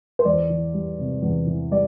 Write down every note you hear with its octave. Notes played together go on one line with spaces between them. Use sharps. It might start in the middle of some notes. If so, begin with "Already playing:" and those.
C5
E2 D5
E3
G3
C3
E2
E3
G3 D5